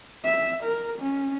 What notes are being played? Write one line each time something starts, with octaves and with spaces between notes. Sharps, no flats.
E5
A#4
C#4